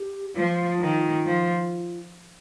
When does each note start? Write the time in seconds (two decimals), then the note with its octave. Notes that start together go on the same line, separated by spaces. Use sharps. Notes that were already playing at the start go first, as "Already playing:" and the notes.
Already playing: G4
0.35 F3 F4
0.80 D#3
1.26 F3